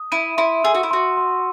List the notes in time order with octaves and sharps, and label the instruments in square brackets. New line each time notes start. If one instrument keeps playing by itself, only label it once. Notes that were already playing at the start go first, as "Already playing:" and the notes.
Already playing: [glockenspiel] D#6
[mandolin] E4 [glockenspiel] D#7
[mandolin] E4 [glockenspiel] C6
[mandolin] G#4 [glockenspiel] E6
[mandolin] F#4
E4
[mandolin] F#4 [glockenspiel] C6
[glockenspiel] C6